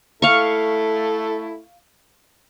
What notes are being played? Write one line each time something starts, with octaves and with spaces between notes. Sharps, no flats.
A3 E4 A4 F5 C#6